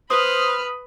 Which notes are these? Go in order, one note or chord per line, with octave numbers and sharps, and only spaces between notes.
B4 C5 B5 D#6 F6